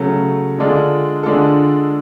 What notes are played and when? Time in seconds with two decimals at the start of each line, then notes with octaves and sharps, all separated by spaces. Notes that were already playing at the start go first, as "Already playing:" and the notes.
Already playing: C#3 F#3 A3 C#4
0.59 D3 G#3 D4 F4 A4
1.23 D3 G#3 D4 F4 A4